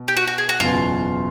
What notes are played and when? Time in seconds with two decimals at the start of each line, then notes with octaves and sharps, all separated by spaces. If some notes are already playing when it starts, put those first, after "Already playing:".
Already playing: B2
0.08 G4
0.17 F#4
0.27 F#4
0.38 G#4
0.49 F#4
0.60 F#1 E2 B2 F4